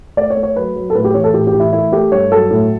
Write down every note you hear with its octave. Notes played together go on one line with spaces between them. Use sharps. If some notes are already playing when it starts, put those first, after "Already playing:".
A3 D5
C#5
A3
C#5
F#3 B4
F#3
A4
A2 B4
G4
E3 C#5
A4
A2 G4
G4
E3
E4
A3 E4
A3 G4
G2 C#5
F#3 A4
A2